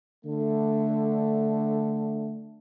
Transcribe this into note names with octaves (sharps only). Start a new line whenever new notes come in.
D3 A3